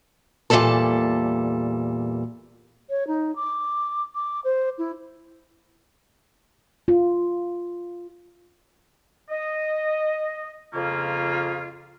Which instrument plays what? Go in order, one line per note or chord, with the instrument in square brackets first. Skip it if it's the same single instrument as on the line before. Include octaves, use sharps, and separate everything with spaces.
[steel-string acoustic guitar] E2 A#2 D#3 G3 A4 A5
[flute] C#5
D#4
D6
D6
C5
E4
[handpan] F4
[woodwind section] D#5
F2 C#3 A#3 C#4 F4